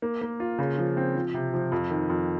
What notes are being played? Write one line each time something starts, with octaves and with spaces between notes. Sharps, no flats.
A#3
A#3
F4
C#3
F3
C4
F3
C3
F3
F2
D#3
F2